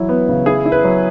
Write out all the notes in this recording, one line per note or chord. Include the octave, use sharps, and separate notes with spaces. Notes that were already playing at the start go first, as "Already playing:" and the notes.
Already playing: E3 F#3 E4
B3
C#3
E4 G#4
E4
B4
F#3